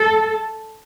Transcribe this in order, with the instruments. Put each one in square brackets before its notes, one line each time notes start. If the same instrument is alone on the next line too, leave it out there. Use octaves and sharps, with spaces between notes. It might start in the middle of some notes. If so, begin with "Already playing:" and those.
Already playing: [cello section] A4